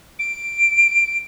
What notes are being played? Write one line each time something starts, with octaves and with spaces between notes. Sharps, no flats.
D7